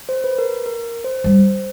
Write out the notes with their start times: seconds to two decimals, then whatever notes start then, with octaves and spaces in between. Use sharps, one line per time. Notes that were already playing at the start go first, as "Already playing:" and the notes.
0.09 C5
0.24 B4
0.38 A#4
0.66 A#4
1.04 C5
1.24 G3